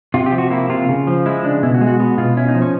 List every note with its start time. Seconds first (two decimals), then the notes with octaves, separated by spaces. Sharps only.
0.14 C3 F4
0.26 G4
0.32 F3
0.38 F#4
0.50 A#3 E4
0.69 C3 F4
0.89 C#3
1.07 F3
1.26 G#3 E4
1.44 C#3 D4
1.63 B2 E4
1.74 F#4
1.81 G#3
1.87 F#4
2.00 B3 F#4
2.18 B2 F4
2.37 C#4 E4
2.49 D#4
2.55 F3
2.62 C#4